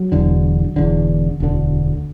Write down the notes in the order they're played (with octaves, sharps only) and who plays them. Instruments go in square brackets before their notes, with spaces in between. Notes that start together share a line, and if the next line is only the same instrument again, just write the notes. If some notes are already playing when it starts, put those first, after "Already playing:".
Already playing: [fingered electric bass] F#3
E1 E2 D3
E1 E2 D3
E1 D2 D3